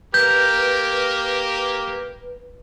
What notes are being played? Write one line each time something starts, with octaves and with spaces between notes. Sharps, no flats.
A#3 G4 A#4 B4 G6